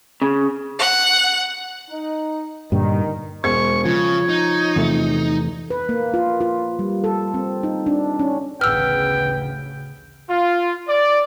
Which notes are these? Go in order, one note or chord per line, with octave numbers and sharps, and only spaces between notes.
C#3
F#5
D#4
G2 A#2 D3 D#3
E1 C5 C#6 G#6
C#3 F3 C#5
D#4
E2 C3 A3
B4
A#3
F4
F4
G3
A4
C4
D#4
D4
C#4
A1 D2 C#3 B3 G5 E6 F6
F4
D5